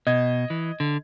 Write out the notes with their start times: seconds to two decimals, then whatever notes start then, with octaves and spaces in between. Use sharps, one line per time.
0.07 B2 D#5 G#6
0.50 E3
0.80 D3